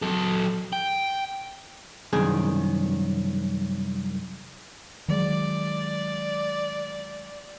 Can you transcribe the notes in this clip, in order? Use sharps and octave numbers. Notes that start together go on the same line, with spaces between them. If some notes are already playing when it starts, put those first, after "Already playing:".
F#3 A4
G5
C2 F#2 D#3 G#4
D#3 F#3 G#3 D5